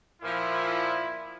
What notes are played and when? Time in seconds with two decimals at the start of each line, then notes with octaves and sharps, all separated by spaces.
0.21 A#2 F3 E4